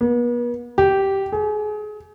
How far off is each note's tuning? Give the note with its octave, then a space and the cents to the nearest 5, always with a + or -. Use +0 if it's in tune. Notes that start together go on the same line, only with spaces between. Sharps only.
B3 -40
G4 -10
G#4 +30